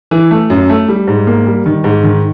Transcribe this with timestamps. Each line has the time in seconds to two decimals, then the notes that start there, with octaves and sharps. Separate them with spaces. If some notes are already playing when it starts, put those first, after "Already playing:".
0.11 E3
0.31 A3
0.50 F#2
0.69 A3
0.88 G3
1.07 G#2
1.27 A#3
1.47 G3
1.66 D#3
1.84 G#2
2.04 D#3